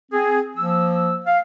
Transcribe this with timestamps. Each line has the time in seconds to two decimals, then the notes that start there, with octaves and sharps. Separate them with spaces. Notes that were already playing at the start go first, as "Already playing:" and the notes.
0.12 C4 G#4
0.57 F3 A#3 E6
1.26 F5